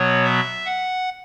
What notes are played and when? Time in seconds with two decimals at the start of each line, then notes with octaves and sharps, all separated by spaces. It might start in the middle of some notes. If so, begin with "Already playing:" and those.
Already playing: B2 F#3 B3 C#5
0.24 E5
0.66 F#5